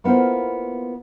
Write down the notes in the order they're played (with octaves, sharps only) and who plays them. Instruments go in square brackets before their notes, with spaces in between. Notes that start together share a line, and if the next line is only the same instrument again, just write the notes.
[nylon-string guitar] A#3 B3 E4 F4 C5